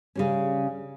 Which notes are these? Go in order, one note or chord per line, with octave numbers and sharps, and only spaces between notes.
C#3 G3 C#4